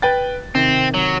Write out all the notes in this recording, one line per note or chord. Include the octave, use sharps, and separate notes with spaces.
B4 G5 A6
C3 D#3 C4
F#3